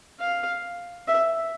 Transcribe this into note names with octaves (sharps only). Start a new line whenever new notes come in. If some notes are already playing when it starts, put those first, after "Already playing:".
F5
E5